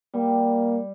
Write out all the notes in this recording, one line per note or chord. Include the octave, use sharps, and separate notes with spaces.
G3 A#3